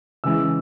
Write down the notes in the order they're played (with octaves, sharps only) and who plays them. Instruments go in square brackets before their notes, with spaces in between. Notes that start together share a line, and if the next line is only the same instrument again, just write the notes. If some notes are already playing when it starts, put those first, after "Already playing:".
[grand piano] C#3 E3 G#3 E6